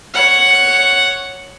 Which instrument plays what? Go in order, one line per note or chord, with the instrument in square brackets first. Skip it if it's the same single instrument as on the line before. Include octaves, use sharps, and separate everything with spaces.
[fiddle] C#5 [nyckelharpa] F#5